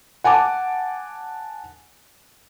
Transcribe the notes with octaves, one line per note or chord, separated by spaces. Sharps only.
F#5 G#5 A5 D6